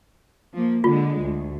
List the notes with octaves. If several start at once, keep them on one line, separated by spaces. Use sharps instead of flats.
F3 A#3
D3 G#3 F4
D2